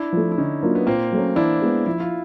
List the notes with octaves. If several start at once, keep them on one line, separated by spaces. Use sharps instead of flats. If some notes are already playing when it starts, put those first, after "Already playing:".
Already playing: D4 E4
F3 A3
E4
D3 C#4 D#4
F#3 A#3 D4 F4
B3
A#2 A#3 C4
F#3 A3 C#4
E3 D4 E4
G#3 B3
F3 E4
F4